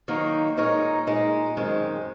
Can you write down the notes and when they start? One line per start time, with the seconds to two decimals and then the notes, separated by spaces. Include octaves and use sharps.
0.08 D#3 F#3 A#3 D#4
0.57 A#2 G#3 D#4 A#4 C#5
1.07 A#2 G#3 D#4
1.56 F#2 D#3 G#3 C4